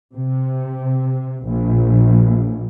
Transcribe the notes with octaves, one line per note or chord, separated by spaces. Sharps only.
C3
A#1